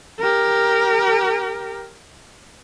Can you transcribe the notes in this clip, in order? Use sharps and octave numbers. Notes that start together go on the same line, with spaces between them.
G4 A#4